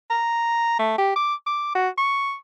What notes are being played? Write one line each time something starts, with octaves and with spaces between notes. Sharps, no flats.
A#5
A3
G4
D6
D6
F#4
C#6